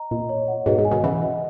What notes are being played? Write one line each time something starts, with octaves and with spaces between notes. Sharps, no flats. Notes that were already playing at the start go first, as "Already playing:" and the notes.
Already playing: D#5 A#5
A#2 D#5
C#5
F#5
G#2 B2 D#5
G#2
G#5
B2 D#3
C#3 E3 F#5
D#5